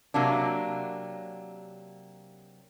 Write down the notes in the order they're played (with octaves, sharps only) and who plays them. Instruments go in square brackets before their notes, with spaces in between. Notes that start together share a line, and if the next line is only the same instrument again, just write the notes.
[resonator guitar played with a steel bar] C3 F#3 A#3 D4